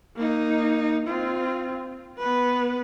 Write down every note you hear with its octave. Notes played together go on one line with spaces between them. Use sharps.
A#3 D#4
C4 F4
B3 B4